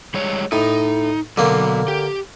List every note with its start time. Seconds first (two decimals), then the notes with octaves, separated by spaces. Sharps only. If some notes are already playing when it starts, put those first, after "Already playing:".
0.14 G3 G#3 C#5
0.52 A2 D#4
1.38 B2 D3 F#3 A#3
1.88 G4